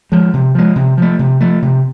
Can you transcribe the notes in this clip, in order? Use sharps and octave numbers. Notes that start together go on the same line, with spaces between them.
F3 G#3
C3
F3 G#3
C3
F3 A3
C3
F3 A3
C3